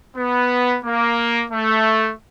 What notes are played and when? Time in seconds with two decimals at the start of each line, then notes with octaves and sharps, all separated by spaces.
0.16 B3
0.83 A#3
1.51 A3